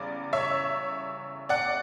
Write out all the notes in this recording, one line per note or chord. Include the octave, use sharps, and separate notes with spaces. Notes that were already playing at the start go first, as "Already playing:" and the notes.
Already playing: E2 C#3 G3 D5
C#5 E5
D5 F#5